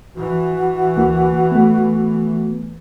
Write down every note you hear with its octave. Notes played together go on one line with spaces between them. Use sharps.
E3 F#4
D2 A#3 E4
A3 B3